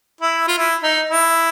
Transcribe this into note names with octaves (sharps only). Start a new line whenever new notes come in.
E4
F4
E4
D#4
E4